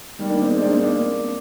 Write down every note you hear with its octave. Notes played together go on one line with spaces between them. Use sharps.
D#3 G3
A#3 D4
C4 D#4
G#3 C4
A#3 D4
C4 D#4
A#3 D4